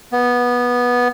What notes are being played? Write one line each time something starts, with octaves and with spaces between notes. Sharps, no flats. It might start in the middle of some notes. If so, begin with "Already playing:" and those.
B3